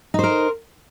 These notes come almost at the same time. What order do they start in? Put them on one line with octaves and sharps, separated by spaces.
D#4 C5 A#4